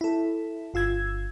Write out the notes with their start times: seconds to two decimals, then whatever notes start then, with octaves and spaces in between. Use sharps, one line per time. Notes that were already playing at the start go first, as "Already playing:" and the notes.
0.01 E4 A4
0.74 G1 F4 E6 G#6